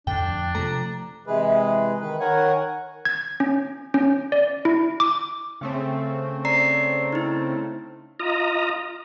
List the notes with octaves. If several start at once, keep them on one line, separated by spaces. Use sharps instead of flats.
F2 A2 D3 D4 G5
F2
C3 F3 A3 A#5
C3 E3 G#3 G#4 B4
D#3 B4
D#3 A#4 C#5 F#5 G#5
G#6
C#4
C#4
D5
E4
D6
C#3 A3 C4
D5 A#5 C7
D#4 E4
F4 D#5 A#5